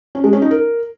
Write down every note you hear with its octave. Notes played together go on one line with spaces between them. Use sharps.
C#4
G#3
C#4
D#4
A#4